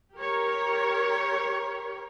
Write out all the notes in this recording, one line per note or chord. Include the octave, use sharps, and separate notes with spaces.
G4 A#4 C#5